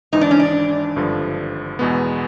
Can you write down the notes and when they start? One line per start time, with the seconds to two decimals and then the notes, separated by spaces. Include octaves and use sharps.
0.12 G#1 G#2 E3 D#4
0.21 D4
0.31 C#4
0.39 D4
0.96 G#1 G2 D3 F3
1.79 E2 B2 G#3 B3